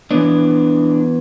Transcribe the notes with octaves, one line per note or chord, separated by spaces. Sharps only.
E3 B3 D4